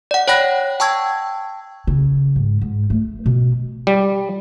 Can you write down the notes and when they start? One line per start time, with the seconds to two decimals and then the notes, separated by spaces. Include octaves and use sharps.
0.11 D5 F#5
0.28 C#5 F#5 G5 B5 F#6 A#6
0.80 G5 A5 C#6 E6 G#6
1.87 C#3
2.36 G#2
2.61 G#2
2.90 A3
3.26 B2
3.87 G3